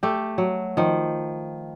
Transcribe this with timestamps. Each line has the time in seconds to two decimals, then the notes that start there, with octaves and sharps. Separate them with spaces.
0.03 A3 G4
0.38 F#3
0.77 D#3 F3